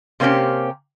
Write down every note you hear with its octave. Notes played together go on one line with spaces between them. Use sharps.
C3 A#3 C4 C#4 G4